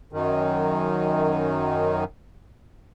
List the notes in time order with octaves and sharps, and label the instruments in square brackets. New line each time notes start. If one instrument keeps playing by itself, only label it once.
[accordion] F#2 D#3